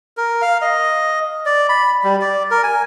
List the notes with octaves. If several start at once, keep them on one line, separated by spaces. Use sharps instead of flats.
A#4
F5
D#5
D5
B5
G3
D5
A#4
G#5